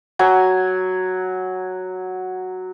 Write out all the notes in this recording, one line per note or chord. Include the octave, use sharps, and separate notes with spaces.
F#3 G#5